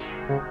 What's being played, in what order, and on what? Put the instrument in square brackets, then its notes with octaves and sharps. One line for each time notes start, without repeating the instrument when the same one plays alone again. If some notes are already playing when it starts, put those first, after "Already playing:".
Already playing: [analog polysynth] C3 D#3 G#3 D#4 F#4
[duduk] C#3